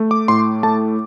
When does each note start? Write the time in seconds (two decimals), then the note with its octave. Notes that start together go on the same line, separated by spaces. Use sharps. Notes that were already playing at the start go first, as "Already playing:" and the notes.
Already playing: A3
0.11 D6
0.28 A2 C6
0.63 A3 A5